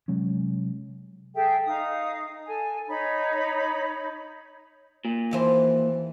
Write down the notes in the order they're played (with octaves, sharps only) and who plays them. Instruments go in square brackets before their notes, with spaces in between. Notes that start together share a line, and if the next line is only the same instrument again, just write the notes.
[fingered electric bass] C3 F#3 G#3 C#4
[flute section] G#4 A4 E5 G5
D#4 F5 D#6
A4 G#5
D#4 C#5 B5
[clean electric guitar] A#2
[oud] D#2 E3 C5